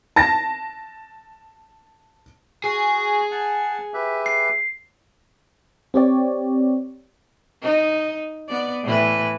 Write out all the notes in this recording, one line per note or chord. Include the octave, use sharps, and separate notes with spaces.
A5 A#6
F#4 G#4
F#5 A5
G4 B4 E5
C7
C4 G4 C#5 D5
D#4
B3 D5
A2 E3 B4